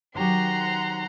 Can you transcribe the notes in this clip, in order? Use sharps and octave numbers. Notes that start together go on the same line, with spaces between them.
D#3 F#3 G4 F#5 A#5 C6